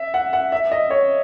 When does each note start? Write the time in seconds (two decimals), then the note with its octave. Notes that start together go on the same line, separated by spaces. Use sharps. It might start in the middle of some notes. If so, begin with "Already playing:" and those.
Already playing: E5
0.14 F#5
0.33 F#5
0.52 E5
0.72 D#5
0.90 C#5